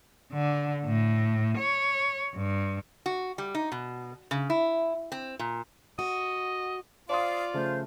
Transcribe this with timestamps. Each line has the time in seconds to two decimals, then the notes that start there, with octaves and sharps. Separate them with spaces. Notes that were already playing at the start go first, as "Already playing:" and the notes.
0.33 D3
0.85 A2
1.57 C#5
2.35 G2
3.06 F#4
3.38 G3
3.55 D#4
3.72 B2
4.31 C#3
4.50 E4
5.12 C4
5.39 A#2
5.99 F#4 D#5
7.09 F4 C5 D5 F5 C6 D#6
7.54 C#3 F3 A3 C5